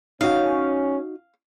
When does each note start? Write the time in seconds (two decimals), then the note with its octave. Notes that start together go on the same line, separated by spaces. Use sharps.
0.21 C#4 D#4 F#4 F5